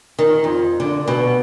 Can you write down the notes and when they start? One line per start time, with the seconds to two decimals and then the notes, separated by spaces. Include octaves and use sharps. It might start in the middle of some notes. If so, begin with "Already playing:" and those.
0.19 D#3
0.44 F2
0.80 D3
1.08 B2